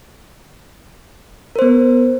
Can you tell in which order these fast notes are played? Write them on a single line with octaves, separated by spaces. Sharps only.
A#4 C5 B3